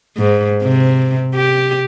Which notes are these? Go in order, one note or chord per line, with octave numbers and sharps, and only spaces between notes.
G#2
C3
G4